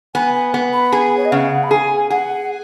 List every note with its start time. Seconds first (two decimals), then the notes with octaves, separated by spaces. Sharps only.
0.14 B3 G#5
0.34 G#5
0.54 B3
0.73 B5
0.92 G#4 G#5
1.17 C#5
1.25 D#5
1.31 C#3 F#5
1.63 B5
1.71 G#4 G#5
2.10 G#4 F#5